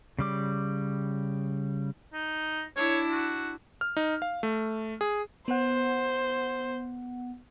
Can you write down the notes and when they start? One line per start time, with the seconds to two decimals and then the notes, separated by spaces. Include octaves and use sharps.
0.19 C#3 G3 D6
2.14 D#4
2.76 D4 E4 C#5
3.11 F#4
3.81 F6
3.97 D#4
4.22 F5
4.43 A3
5.01 G#4
5.48 B3 C5 F#5